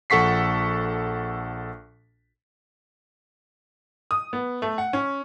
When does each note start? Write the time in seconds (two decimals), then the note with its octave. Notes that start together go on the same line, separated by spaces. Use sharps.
0.10 A#1 A4 F#5 C#6 B6 C7
4.11 D#6
4.33 B3
4.62 A3
4.78 F#5
4.93 C#4